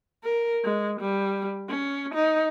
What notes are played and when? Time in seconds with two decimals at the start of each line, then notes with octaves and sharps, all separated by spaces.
0.24 A#4
0.64 G#3
1.00 G3
1.69 C#4
2.14 D#4